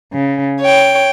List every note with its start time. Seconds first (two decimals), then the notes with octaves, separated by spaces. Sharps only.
0.14 C#3
0.61 C#5 G5